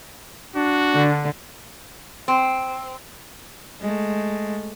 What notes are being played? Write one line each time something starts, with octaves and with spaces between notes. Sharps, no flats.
D4 F#4
D3
C4
G#3 A3